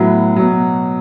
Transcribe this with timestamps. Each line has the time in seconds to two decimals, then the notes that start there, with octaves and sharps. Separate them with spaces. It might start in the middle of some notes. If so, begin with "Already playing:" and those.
Already playing: A2 F#3 B3
0.36 B2 F#3